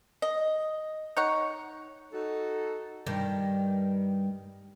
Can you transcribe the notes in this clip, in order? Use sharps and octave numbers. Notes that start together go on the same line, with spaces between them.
D#5
D#4 C#5 F#5
D#4 F#4 A4
G2 D#3